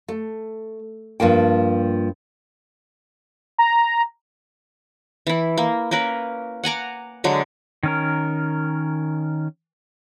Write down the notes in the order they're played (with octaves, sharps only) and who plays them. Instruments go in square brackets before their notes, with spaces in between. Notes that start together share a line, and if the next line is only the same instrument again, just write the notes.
[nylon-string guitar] A3
G2 F3 A#3 G5
[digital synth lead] A#5
[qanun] E3 E4
A#3
A#3 C#4 A#4 B4
F#5 G#5 A#5 D6
D3 F#3 G#3
[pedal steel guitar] D#3 C#4 A#4